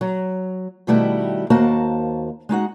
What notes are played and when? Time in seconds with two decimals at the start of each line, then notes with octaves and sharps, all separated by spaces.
0.01 F#3
0.87 B2 D#3 G3 A3 E4 F#4
1.50 D#2 A#3 F#4 C5 A5
2.49 G#3 D#4 F#4 F#5